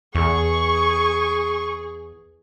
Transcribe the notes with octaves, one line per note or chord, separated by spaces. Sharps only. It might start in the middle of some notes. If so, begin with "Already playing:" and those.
E2 G#4 C#6